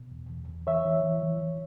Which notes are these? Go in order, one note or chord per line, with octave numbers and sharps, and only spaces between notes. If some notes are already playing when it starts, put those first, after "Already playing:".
Already playing: B2
E2
E2
E2
E3 C#5 E5
E3
E3
E3
E3